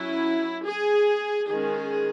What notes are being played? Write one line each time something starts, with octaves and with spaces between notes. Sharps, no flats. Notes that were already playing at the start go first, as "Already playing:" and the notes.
Already playing: F#3 C#4 E4
G#4
D#3 G#3 C#4 G#4